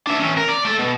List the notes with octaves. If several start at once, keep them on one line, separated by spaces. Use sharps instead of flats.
D4 E5
E3 C#4
A#4
D5
A3 A4
B2